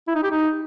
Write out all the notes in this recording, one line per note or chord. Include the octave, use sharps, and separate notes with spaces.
E4
D#4
G4
D#4